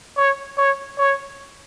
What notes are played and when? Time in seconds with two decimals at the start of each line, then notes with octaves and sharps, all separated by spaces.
0.17 C#5
0.58 C#5
0.98 C#5